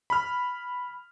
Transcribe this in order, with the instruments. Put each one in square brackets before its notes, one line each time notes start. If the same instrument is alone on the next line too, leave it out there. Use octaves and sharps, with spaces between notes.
[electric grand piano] B5 F6